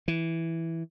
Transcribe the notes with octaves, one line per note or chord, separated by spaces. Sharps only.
E3